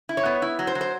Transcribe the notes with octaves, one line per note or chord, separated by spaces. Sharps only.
E4
C#5
B3
E4
F#3
C5
F#3
C5